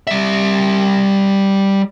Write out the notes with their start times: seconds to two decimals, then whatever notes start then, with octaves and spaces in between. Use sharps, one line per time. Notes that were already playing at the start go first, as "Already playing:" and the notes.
0.07 G3 E5